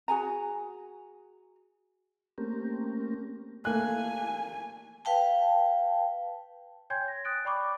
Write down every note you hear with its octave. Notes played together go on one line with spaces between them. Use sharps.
F#4 G#4 G#5 A#5
A3 A#3 C4 C#4 G4 A#4
A3 A#3 G#5 F#6
B4 F5 G5 A5
C#5 G5 G#5 C6 G6 G#6
A#6
D#6 F#6 A6 D7
D5 G5 B5 C#6 D6